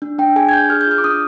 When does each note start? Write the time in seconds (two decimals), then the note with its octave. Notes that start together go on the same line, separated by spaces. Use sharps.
0.02 D4
0.19 D4 G5
0.36 G#4 G#5
0.49 G#6
0.53 D4 G6
0.70 G#4 F6
0.81 G6
0.87 F4 F6
0.98 D6
1.04 D4 D#6